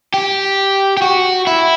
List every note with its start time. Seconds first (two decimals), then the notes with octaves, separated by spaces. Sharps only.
0.14 G4
0.97 G4
1.02 F#4
1.47 E4